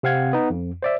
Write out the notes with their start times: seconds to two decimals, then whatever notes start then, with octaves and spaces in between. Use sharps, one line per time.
0.03 C3 C4 F5 F#5 G#6
0.33 B3 D#4
0.50 F2
0.83 C5 D5 E5